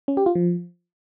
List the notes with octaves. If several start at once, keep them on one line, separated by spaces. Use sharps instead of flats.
C#4
G4
F4
F3